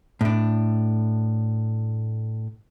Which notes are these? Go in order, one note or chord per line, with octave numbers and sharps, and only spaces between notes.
A2 D4